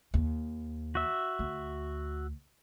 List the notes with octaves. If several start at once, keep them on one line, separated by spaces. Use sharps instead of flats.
D#2
F#4 E5
D2